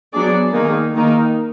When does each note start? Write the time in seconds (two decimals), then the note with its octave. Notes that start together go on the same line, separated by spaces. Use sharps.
0.13 F#3 B3 D4 G#4 D5
0.53 D#3 A#3 D#4 G#4
0.95 D#3 A#3 D#4 A#4